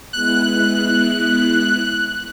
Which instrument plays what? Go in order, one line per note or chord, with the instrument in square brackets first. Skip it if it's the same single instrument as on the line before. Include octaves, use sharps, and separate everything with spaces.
[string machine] G#3 B3 E4 [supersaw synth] F#6